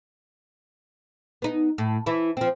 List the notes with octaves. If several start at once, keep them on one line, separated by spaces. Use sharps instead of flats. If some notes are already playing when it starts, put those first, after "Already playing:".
B3 D#4
A2
E3 E4
F3 C4